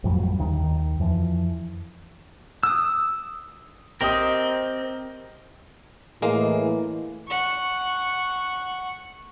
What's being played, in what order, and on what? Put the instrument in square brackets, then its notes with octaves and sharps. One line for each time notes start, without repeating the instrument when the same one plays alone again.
[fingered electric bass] A1 F2 F#3 G3
D#2 D#3
F2 E3 F3
[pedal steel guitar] D#6 E6
[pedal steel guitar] C4 A#4 [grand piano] G4 D#5 D#6
[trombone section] A2 [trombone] E3 [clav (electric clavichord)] G#3 A#3
[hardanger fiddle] F#5 C#6